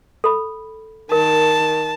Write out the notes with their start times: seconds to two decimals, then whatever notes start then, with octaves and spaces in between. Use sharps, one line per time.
0.24 A4 B5
1.12 D#3 A#4 A5